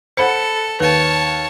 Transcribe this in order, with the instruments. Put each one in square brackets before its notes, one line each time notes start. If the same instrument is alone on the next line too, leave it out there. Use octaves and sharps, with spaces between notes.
[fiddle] A4 [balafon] C5 [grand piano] F#5 B5 C#7
[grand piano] D#2 [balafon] B4 [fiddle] C#5 A5